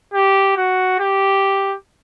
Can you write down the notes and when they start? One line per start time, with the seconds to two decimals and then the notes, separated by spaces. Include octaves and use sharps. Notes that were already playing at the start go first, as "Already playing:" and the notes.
0.14 G4
0.57 F#4
0.99 G4